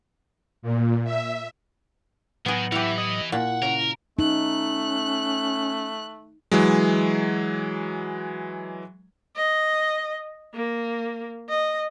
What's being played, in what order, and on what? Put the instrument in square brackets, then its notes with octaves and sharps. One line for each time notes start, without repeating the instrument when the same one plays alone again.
[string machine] A#2
E5
[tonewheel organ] A2 F#3 [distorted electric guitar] D#3 [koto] B3 G#4
[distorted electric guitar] E3 [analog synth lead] E4 [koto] G4 F#5
[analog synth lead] D#5
[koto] A#2 [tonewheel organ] E4 [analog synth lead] F#5
[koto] C#3 [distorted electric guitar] A#4
[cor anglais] A3 [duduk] C#4 [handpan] D#4 [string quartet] F#6
[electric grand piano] E3 F#3 G#3
[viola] D#5
A#3
D#5